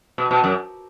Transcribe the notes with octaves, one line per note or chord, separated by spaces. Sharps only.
B2
B2
F#2